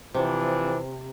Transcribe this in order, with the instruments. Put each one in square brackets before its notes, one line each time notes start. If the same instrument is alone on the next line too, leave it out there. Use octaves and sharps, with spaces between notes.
[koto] C3 [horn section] E3 F3 D4